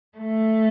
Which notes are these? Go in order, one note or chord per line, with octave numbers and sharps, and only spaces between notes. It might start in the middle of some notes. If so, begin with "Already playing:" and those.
A3